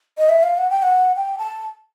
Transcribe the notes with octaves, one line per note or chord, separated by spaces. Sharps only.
D#5
E5
F5
F#5
G5
F#5
G5
A5